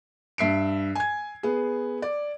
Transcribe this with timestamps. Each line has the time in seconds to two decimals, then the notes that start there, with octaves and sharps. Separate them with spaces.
0.38 G2 E5 C7 D7
0.95 G#5 G#6
1.43 B3 G#4
2.02 D5